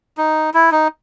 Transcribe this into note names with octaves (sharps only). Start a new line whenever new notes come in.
D#4
E4
D#4